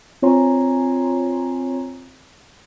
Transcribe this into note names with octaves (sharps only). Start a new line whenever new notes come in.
C4 F4 C#5 G#5 A#5 C6